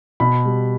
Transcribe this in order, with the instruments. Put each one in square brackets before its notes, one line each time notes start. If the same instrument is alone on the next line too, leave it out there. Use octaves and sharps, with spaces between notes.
[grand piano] B2 B5
G3